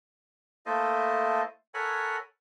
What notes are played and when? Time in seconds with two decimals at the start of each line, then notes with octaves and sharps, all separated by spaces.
0.66 A3 A#3 E4 A4 C5 D#5
1.74 A4 A#4 C#5 F#5 G#5 B5